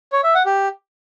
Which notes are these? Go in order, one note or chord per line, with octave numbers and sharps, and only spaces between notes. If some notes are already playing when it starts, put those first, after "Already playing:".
C#5
E5
F#5
G4